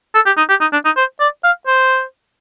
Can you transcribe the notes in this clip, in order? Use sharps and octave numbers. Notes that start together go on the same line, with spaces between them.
A4
G4
D#4
G4
D#4
D4
D#4
C5
D5
F5
C5